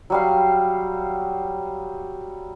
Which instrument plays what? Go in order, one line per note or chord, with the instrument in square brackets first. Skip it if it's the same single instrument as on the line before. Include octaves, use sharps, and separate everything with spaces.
[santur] F#3 G3 F5